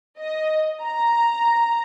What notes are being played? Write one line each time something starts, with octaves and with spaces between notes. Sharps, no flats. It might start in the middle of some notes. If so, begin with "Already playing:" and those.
D#5
A#5